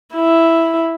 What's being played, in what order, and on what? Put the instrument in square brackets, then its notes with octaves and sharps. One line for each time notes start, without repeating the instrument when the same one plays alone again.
[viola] E4